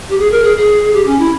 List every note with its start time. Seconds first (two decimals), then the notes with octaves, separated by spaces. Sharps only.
0.09 G4
0.19 G#4
0.32 A#4
0.44 G#4
0.57 G#4
0.94 G4
1.06 C#4
1.19 E4